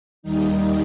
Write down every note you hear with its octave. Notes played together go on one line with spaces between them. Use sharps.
D#2 D#3 G3 D#4